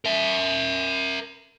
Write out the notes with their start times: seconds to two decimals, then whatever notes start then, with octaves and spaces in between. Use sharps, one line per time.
0.05 A#4 E5